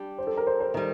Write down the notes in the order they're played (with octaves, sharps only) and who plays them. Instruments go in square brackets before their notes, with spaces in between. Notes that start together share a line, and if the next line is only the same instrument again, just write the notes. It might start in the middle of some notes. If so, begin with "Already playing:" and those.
Already playing: [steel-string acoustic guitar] G3 D4 G4
[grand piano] C5
A4
A#4
C5
C5
[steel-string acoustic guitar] D#3 G3